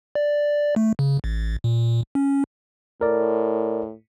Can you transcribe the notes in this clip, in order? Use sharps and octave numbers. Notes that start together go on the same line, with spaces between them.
D5
A3
C#3
A1
A#2
C#4
A2 A#4 D5